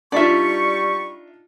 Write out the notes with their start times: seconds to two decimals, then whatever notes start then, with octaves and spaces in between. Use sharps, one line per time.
0.12 G3 D4 D#4 F4 D5 E5 B5 C#6